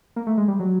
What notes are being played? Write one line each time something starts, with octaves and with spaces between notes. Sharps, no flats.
A#3
A3
G#3
G3
F#3